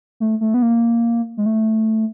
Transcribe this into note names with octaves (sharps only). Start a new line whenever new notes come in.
A3
A3
B3
A#3
G#3
A3